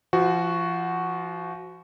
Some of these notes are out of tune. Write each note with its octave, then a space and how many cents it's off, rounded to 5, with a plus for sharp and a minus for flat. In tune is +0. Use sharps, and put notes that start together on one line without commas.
F3 -30 F#4 +0